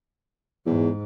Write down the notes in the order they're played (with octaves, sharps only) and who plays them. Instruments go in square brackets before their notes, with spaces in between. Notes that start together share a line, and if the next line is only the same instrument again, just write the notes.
[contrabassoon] E2 [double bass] G#2